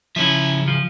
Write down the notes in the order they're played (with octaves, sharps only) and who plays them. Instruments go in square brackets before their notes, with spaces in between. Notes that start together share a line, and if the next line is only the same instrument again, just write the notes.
[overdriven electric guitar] C#3 E5 [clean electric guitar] F3 C#4 E4
[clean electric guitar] F3